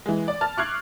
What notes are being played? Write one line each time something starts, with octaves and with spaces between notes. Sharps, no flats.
E3 G#3
D5
A5 F6 A6
C#6 D6 F6 F#6 G#6 C7